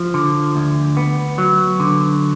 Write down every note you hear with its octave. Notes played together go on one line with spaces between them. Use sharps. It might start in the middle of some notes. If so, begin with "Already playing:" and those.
Already playing: F3
D3
D2
B3
F#3
D3